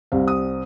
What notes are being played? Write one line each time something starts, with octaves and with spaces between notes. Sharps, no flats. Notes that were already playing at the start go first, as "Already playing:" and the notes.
C2 C3 G3 C4 F5
D#6